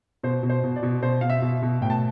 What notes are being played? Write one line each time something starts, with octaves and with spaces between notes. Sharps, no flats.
B2 C5
B2
C5
B2
D5
B2
B2 C5
B2 F5
E5
B2
B2
A2 G5
A5